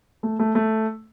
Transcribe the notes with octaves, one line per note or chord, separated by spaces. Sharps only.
A3
A3
A3